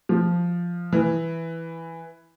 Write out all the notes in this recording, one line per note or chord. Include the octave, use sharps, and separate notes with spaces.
F3
E3